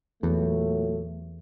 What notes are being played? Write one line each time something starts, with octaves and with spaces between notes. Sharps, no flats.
E2 A#2 F#3 A3